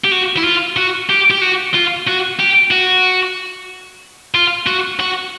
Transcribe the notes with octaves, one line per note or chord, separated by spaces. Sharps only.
G4
F#4
E4
F4
F#4
G4
G4
F#4
F4
F#4
G4
F#4
F4
F#4
F#4